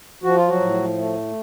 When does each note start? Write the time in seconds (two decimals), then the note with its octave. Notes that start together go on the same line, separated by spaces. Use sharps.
0.24 F3 F#4
0.36 F4
0.48 F#3 F#4
0.60 A2
0.97 A3